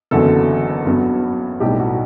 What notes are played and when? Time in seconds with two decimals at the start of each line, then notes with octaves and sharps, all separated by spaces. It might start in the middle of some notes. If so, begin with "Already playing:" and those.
0.11 F#1 E2 D3 F#3 A4
0.86 G2 F#3 B3
1.60 B1 A2 G3 C4 G4
1.80 F#4